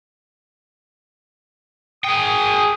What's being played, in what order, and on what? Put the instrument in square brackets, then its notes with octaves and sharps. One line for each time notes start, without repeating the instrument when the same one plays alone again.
[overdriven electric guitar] G#4 G5 [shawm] D#6